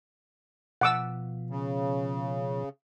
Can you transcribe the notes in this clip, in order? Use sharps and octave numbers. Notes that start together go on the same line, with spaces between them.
B2 F3 F#5 D6 E6
C#3